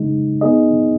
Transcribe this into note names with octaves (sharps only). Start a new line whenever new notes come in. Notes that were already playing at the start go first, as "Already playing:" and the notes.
Already playing: C#3 G#3 D#4
B3 D#4 G#4 D#5